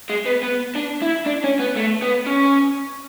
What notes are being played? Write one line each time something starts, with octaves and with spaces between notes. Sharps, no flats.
G#3
B3
B3
D4
E4
D4
C#4
B3
A3
B3
C#4